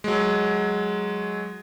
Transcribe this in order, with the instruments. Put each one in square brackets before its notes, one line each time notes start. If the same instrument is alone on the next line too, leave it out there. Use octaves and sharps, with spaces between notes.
[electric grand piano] F#3 G#3